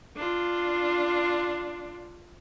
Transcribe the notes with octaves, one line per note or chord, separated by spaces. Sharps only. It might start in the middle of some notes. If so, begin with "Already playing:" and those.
D4 F4